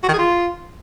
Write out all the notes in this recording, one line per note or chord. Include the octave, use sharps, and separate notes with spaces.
F#4
D#3
G#4
F4